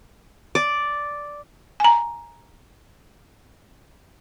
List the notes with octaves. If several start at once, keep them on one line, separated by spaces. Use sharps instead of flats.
D5
G#5 A#5